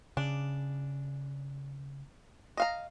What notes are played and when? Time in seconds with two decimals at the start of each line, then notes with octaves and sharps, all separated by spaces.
0.17 C#3 D4
2.57 D#5 F5 A#5